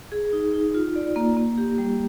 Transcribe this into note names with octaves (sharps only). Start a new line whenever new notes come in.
G#4
D#4
D#4
F4
D5
A#3
A#3
G4
G3